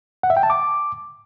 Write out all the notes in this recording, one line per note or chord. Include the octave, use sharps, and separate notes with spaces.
F#5
E5
G5
A5
D6